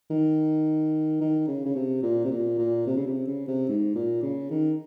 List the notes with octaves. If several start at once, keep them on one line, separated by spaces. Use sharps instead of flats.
D#3
D#3
C#3
C#3
C3
A#2
C3
A#2
A#2
C3
C#3
C3
C#3
C3
G#2
A#2
C#3
D#3